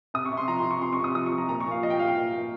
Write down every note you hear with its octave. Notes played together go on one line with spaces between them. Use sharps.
C3 D#6
C#6
C3
C6
F3 A#5
C6
F3
C#6
C3 C6
C#6
C3
D#6
F3 D#6
C#6
F3
A#5
A#2 A#5
C#6
A#2
F5
F3 D#5
G5
F3 F5
G5
A#2
A#2